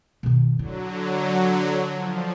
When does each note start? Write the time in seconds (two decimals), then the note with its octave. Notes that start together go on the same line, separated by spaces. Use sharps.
0.23 B2 D#3
0.59 D3 F#3 E4
1.93 F3